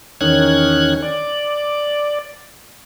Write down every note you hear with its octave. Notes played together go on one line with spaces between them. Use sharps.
E2 D#3 C#4 F#6 G#6
D5